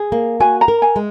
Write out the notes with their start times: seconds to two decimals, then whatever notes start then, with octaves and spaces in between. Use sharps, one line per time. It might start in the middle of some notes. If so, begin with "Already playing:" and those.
Already playing: G#4
0.12 A#3
0.40 F#4 G#5
0.61 A#5
0.68 A#4
0.82 G#5
0.96 G#3